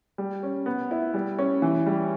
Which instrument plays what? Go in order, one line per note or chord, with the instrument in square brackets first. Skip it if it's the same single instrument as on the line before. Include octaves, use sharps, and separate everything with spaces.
[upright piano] G3
C#4
B3
E4
G3
C#4
E3
G3